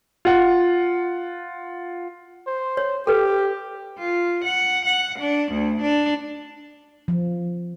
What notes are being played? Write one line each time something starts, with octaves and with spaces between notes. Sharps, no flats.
F4 F#5
C5
C#5
G4 A4 B4
F4
F#5
F#5
D4
D2
D4
F3